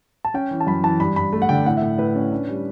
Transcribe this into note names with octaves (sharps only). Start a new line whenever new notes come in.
A5
C#4 G5
E3
A5
F#2 B5
E3 A5
G2 B5
G2 B5
A3
F#5
D3 G5
A2 F#5
A2 E5
A2 B4
C#4
D4
G3